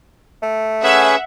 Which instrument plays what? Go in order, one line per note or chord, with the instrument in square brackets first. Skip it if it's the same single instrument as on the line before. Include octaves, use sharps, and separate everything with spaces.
[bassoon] A3
[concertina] C#4 G#4 B4 [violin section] E5 F#5